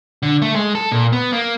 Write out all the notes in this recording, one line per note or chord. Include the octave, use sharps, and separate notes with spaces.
D3
A3
G#3
A4
A#2
B3
A#3